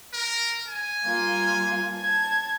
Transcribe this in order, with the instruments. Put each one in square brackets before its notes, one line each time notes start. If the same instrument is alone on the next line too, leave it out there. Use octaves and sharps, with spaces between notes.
[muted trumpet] A#4
G#5
[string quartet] G3 A#3 F4
A5 G#6